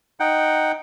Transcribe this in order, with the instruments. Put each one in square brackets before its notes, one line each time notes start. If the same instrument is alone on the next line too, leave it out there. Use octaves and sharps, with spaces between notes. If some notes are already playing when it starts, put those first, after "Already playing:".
[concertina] D#4 F#5 G5